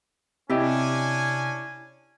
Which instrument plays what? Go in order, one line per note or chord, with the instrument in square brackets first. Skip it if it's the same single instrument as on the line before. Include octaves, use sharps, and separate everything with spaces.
[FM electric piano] C3 [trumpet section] C#4 D4 G#5 [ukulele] E4 G4 D#5